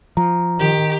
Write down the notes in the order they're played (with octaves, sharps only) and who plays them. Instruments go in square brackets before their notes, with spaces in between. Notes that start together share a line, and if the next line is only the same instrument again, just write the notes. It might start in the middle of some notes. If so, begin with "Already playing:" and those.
[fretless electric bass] F3 [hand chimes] A#5
[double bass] D#3 [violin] G4